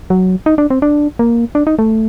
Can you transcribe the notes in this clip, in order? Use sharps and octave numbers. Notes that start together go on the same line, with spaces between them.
F#3
D#4
D4
C4
D4
A#3
D4
D#4
A3